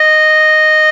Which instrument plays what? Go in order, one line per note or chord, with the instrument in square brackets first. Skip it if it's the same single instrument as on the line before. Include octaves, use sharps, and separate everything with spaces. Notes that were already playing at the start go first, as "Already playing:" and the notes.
Already playing: [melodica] D#5